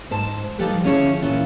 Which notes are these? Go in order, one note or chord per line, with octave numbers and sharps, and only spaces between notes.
G#2 C5 A5
F3 G3 D#4 G4 A4 B4
D3 F3 C#4 E4 G#4 C#5
A#2 E3 C#4 F4